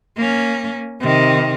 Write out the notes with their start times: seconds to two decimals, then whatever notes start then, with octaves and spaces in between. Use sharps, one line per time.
0.16 A#3 C#4
1.00 C3 D#3